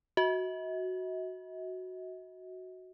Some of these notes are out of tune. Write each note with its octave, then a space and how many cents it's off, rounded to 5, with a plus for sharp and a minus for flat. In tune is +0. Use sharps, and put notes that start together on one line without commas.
F#4 +0 D#5 +45